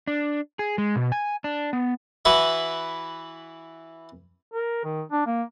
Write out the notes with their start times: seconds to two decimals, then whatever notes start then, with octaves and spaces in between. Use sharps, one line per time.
0.07 D4
0.59 G#4
0.78 G#3
0.96 B2
1.12 G#5
1.44 D4
1.73 B3
2.25 E3 E4 F#4 B4 E5
4.53 A#4
4.85 D#3
5.12 D4
5.27 A#3